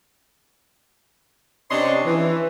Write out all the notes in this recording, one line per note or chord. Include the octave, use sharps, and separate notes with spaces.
C3 C#4 D4 C#5 D#5 C6
E3